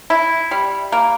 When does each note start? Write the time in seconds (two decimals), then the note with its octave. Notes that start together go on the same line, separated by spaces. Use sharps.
0.10 E4
0.51 G3
0.92 A#3